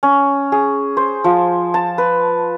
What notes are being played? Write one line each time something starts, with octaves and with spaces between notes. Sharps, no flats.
C#4
G#4
C5
F3
A5
B4